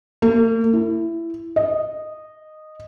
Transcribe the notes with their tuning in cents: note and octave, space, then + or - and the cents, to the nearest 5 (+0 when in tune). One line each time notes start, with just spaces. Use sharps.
A#3 -45
E4 +15
D#5 -10